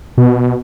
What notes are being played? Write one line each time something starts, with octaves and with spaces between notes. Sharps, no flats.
B2